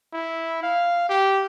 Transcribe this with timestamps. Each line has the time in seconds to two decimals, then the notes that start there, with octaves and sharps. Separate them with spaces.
0.13 E4
0.63 F5
1.09 G4